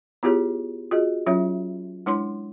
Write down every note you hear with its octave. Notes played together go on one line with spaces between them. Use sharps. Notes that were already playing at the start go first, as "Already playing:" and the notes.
B3 E4 F4 G4 G#4 C#5
F4 F#4 G#4 D#5
F#3 C#4 F4 C#5 E5
G#3 D4 E4 C#5 C6